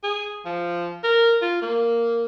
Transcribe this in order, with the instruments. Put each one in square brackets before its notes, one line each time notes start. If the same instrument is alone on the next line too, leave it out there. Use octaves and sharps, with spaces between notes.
[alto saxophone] G#4
F3
A#4
F4
A#3